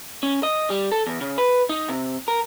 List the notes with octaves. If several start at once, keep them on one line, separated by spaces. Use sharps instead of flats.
C#4
D#5
G3
A4
E2
C#3
B4
D#4
C3
A#4